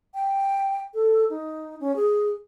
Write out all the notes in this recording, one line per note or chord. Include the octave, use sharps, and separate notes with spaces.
G5
A4
D#4
C#4
G#4